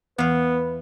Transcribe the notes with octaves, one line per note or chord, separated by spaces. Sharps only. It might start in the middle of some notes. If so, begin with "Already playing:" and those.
E2 B3 B4 F5